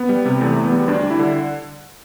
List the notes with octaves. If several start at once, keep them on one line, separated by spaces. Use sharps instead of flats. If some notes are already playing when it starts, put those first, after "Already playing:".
Already playing: B3
G3
C3
E2 A3
E2
B3
G3
D2 D4
G3
E4
D3